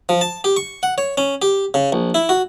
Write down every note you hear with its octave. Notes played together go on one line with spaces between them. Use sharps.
F3
A5
G4
C#6
F#5
C#5
C#4
G4
C#3
A#1
E4
F#4